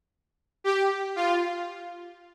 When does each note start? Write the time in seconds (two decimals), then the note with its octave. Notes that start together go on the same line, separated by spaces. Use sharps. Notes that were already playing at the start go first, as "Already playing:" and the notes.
0.64 G4
1.16 F4